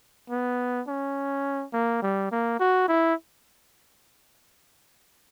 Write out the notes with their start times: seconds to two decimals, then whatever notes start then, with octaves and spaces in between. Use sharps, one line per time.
0.30 B3
0.87 C#4
1.73 A#3
2.02 G3
2.31 A#3
2.60 F#4
2.88 E4